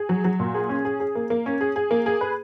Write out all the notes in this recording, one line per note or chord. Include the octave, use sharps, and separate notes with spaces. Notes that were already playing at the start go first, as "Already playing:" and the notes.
Already playing: G#4
F#3
F#3
A#2
G#4
C#4
G#4
G#4
A#3
A#3
C#4
G#4
G#4
A#3
G#4
B4